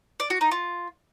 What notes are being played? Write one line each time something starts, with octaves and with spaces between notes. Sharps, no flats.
D5
F#4
D#4
F4